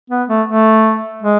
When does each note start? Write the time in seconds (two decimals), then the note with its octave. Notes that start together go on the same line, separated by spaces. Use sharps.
0.10 B3
0.28 A3
0.48 A3
1.23 G#3